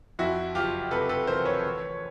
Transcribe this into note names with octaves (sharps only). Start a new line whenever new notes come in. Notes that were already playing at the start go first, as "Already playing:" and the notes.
F2 E4 F#4
F#1 F4 G4
C3 A4 B4
A4 B4
E3 A#4 C5
B4 C#5
D2